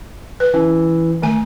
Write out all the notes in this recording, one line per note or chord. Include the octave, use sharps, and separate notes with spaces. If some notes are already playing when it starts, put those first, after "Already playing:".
B4
E3 C#4
D#3 A3 G#5